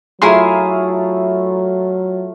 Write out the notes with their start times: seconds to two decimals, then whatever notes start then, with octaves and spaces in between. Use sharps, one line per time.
0.22 F#3 A3 E4 F4 G#4 A#5 C6